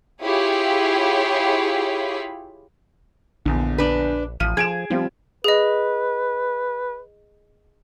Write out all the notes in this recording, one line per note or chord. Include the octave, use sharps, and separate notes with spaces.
E4 F4 G4 G#4 C#5 B5
A#1 E2 D3
D4 B4
A1 F3 D#7
F3 G#4 G#6 D7 E7
F3 G3 C4 F4
G#4 B4 D#5